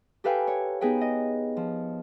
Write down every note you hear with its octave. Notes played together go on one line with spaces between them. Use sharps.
G4 A4 B4 F5 G5 G#5
C#5
B3 D#4 G#4 B4 G5
D#5
F3